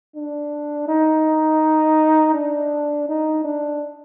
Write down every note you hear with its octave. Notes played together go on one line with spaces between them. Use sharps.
D4
D#4
D4
D#4
D4